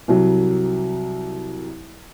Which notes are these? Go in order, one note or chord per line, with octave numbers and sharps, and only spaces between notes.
C2 F#3